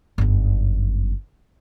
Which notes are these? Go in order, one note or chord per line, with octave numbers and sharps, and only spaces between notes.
G1 F#2